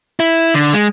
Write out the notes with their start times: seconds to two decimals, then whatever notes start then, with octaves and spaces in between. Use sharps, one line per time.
0.20 E4
0.54 D3
0.73 G#3